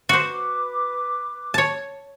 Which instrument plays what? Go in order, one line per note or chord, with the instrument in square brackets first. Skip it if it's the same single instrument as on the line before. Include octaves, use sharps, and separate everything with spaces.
[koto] F#4 C5 [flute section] B4 D6
[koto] C#5 A5